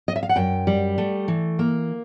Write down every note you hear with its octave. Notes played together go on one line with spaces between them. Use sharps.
D#5
E5
F5
F#5
F#2 G5
G3
A3
E3
A#3